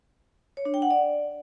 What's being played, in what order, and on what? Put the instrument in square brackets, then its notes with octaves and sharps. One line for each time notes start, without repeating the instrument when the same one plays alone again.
[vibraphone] C#5
D4
G5
F#5
D5